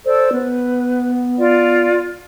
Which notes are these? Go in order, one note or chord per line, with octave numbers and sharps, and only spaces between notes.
A4 C5 D5 E6
B3 B4
F4 D5